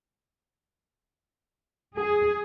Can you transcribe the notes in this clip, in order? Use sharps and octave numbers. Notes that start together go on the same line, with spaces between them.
G#4